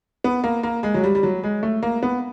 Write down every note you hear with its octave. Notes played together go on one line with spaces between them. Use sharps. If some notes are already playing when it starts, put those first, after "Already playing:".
B3
A#3
A#3
G#3
F#3
G3
G3
F#3
G#3
A3
A#3
B3